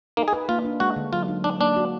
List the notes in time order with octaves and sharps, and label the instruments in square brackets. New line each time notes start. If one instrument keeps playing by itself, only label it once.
[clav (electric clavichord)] A#3 [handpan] D#4
[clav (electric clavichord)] G#4
[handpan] B4
[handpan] A#3 [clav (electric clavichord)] F4
[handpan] D4
[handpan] G#3 [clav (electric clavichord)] F#4
[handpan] D3
[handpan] F#3 [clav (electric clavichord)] F4
[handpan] D#4
[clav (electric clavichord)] D4 [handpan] D#4
[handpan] A#3 [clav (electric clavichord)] D4
[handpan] F#4